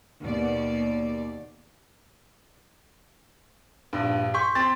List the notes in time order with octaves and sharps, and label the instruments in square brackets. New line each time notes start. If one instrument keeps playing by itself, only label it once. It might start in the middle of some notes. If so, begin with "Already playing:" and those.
[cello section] D#2 B2 A#3 D5
[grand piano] A#1 G2
C6 C#6 G6 B6
C4 C6 A6